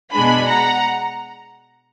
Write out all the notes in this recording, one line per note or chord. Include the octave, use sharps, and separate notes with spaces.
B2 G#3 D4 G#5 B5
F#5 A#5